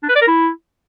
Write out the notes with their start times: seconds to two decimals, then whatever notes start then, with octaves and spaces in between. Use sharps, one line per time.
0.03 D4
0.09 B4
0.15 D5
0.21 A#4
0.27 E4